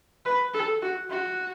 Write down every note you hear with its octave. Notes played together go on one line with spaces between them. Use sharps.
B4
A4
F#4
F#4